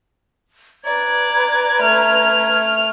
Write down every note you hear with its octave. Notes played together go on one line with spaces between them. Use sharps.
B4 D5 A#5 G#6
A3 F6